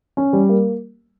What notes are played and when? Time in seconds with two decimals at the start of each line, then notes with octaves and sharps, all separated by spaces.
0.17 C#4
0.33 G3
0.49 A#3